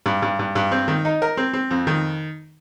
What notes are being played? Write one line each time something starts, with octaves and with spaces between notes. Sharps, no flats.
G2
G2
G2
G2
C4
D#3
D#4
A#4
C4
C4
F2
D#3